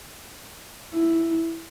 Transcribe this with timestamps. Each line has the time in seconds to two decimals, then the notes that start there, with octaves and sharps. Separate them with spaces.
0.93 E4